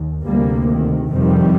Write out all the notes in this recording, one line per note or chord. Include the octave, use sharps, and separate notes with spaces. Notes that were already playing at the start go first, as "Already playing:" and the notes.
Already playing: D#2
D2 C3 G3 A#3
D#3
F2 C3 D#3 G3